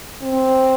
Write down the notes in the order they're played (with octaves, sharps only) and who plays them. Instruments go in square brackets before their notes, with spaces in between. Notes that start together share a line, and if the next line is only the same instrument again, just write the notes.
[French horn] C4